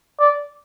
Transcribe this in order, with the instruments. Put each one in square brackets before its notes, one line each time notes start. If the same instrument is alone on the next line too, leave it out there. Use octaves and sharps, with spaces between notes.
[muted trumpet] D5